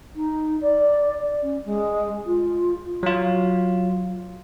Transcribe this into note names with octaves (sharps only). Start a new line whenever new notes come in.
D#4
D5
C#4
G#3
F4
F#3 F4